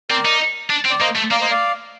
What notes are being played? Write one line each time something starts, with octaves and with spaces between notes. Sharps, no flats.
C4 A#4 D5
D#4
D4
C4
D5
A#3 C5 D#5
A3
A#3 D5 F5
C5 D#5
D5 F5